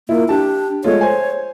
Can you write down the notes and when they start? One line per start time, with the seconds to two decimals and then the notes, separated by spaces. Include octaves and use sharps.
0.09 A#3 E4 F4
0.29 D4 G4 A5
0.84 G#3 A3 F4 C#5
1.01 C5 G#5